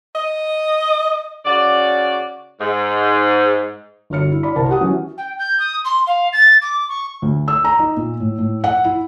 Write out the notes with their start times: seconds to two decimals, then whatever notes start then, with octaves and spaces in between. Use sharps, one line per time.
0.15 D#5
1.45 C#3 F#4 D5
2.60 G#2
4.10 G1 F#4 C#5 F6 C#7
4.32 E4
4.43 D5 B5
4.56 C2 A#4 C5 A5
4.69 G4 F#5 D#6
4.80 E3 F#3 C#4
5.17 G5
5.38 G6
5.59 D#6
5.84 C6
6.07 F5
6.32 A6
6.61 D6
6.88 C#6
7.22 D2
7.48 E6
7.64 A#5
7.79 D#4
7.97 A#2
8.20 A2
8.38 A2
8.64 F#5
8.85 E4